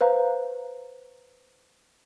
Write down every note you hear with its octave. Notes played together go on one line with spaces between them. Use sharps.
B4 C5 F5 A#5